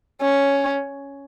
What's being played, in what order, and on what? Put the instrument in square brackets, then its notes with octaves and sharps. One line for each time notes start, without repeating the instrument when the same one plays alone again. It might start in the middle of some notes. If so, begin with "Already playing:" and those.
[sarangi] C#4